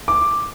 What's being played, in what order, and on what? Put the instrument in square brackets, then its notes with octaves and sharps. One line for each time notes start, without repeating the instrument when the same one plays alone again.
[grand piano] D6